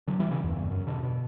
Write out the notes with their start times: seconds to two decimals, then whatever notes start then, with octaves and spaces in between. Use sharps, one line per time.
0.08 D3 F#3
0.20 E3 G3
0.31 C#3 E3
0.44 E2 G2
0.56 E2 G2
0.71 F#2
0.87 B2 D3
1.03 B2